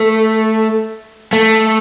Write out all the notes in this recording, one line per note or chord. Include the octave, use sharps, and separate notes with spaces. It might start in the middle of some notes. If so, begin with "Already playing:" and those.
Already playing: A3
A3